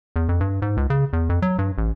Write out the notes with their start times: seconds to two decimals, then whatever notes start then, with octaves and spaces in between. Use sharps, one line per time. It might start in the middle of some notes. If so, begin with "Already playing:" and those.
0.16 E2
0.29 F2
0.41 G2
0.62 G#2
0.77 C#2
0.90 C#3
1.13 E2
1.29 F2
1.42 F#3
1.59 G2
1.78 A1